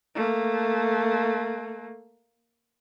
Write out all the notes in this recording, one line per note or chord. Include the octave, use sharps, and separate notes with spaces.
A3 A#3